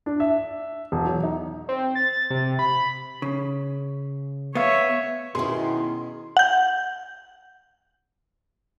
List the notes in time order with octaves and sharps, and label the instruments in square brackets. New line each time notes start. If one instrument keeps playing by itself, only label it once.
[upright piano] D4
E5
E1
F#3
D#4
[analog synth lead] C4
A6
C3
B5
[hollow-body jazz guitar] C#3
[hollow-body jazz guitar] B3 F5 [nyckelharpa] C#5 E5
[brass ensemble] B2 D#3 [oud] C#4 E4 [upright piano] G#4 [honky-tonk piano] C6
[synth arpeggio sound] F#5 G6